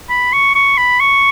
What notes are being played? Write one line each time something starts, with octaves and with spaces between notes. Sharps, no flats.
B5
C#6
C#6
B5
C#6